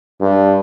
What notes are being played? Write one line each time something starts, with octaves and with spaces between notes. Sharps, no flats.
G2